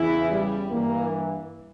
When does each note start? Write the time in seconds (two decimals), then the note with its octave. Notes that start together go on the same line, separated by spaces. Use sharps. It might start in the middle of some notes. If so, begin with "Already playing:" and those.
Already playing: E2 C#3 E3 E4
0.31 G3
0.71 G2 E3 A#3